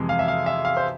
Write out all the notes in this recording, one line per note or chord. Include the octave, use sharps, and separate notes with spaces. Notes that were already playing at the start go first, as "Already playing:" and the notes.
Already playing: F2 C3 E3 G#3
F5
E5
F5
E5
F5
C5